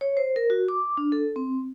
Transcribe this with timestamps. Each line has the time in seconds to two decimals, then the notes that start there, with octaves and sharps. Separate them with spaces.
0.01 C#5
0.17 C5
0.36 A#4
0.50 F#4
0.68 D6
0.97 D4
1.12 A4
1.36 C4